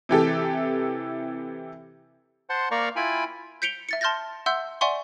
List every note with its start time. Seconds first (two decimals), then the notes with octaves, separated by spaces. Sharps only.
0.09 C3 E3 G4 A4
2.50 C5 F#5 A5 C6
2.71 A#3 A#4 D5 F5 A#5 C#6
2.96 E4 F4 G5 G#5 B5
3.62 G6 B6 C#7 D7 F7 G7
3.89 E5 A6 C#7
4.01 A5 C6 F6 G6 A6 A#6
4.46 E5 F#5 C6 E6 G6
4.81 D5 E5 F#5 G#5 C6 C#6